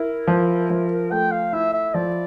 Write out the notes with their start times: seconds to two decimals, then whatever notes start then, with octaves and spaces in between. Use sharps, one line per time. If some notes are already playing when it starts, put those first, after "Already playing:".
Already playing: E4 A#4
0.28 F3
0.70 F3
1.11 A3 G5
1.31 F5
1.53 E4 E5
1.73 E5
1.94 F3 D5